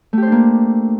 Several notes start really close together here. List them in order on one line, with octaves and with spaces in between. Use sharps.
A3 G4 C5 D4 A#3